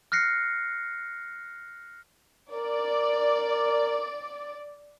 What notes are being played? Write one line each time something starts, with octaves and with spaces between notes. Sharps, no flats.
F6 F#6 A#6 C7 C#7
A#4 D5